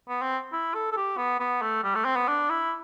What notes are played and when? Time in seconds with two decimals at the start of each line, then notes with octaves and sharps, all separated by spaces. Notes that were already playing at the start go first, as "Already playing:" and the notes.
0.09 B3
0.22 C4
0.52 E4
0.74 A4
0.92 A4
0.96 G4
1.17 B3
1.40 B3
1.62 A3
1.84 G3
1.95 A3
2.05 C4
2.16 B3
2.28 D4
2.49 E4